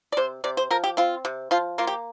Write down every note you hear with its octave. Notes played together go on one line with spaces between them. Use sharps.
D5
C3 C5
C3 D5
C5
F3 A#4
G4
C4 F4
C3
F3 F4
A#3 F4
G4